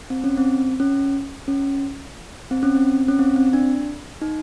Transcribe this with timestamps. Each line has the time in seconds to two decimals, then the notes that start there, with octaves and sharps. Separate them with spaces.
0.10 C4
0.24 C#4
0.37 C4
0.80 C#4
1.48 C#4
2.51 C4
2.63 C#4
2.75 C4
3.08 C#4
3.19 C4
3.36 C4
3.53 D4
4.22 D#4